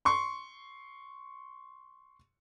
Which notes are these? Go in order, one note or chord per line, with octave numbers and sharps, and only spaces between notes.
C6 C#6